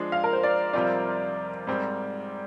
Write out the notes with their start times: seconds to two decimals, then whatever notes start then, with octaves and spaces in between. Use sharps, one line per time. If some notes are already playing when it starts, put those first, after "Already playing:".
Already playing: F3 G#3 D4
0.12 F5
0.24 A#4
0.33 C5
0.43 D5
0.73 F2 C3 G3 C4 F4 D5
1.67 G#2 G3 C4